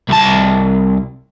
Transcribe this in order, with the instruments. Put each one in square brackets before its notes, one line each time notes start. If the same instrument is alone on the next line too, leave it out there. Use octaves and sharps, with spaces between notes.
[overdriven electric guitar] C2 A5